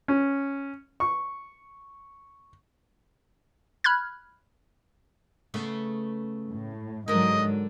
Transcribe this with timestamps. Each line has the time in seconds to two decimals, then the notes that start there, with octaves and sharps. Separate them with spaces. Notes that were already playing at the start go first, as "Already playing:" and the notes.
0.08 C#4
1.00 C#6
3.84 B5 F6 F#6 G#6
5.54 C#3 A3 B3
6.50 A2
7.08 G#2 D3 F#3 A#4 D#5